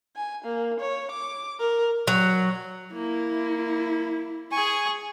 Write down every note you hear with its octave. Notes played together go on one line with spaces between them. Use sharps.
G#5
A#3
C#5
D6
A#4
F#3
A#3 E4
G#4 G#5 C#6